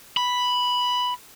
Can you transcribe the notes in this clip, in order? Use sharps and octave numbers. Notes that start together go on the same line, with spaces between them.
B5